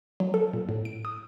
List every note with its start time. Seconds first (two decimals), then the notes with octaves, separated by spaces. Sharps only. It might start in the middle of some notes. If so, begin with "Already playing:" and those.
0.20 F#3
0.34 A4
0.54 A#2
0.69 A2
0.85 D7
1.05 D#6